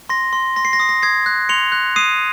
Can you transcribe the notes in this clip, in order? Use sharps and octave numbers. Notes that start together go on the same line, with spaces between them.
C6 A#6
C6
C6 A#6
C7
A#6
D#6 C7
A#6
D#6 G#6 C7
F#6
C6 C#7 F7
F#6
D#6 C7 D#7